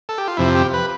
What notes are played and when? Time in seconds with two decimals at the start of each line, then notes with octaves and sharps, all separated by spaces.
0.09 A4
0.18 G4
0.28 F4
0.37 F2 C3 F3 E4
0.55 G4
0.73 B4